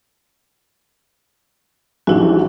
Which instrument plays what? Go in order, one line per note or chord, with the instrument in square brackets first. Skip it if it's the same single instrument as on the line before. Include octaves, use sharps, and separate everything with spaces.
[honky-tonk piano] A1 G#2 F#3 [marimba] D4 E4 F#4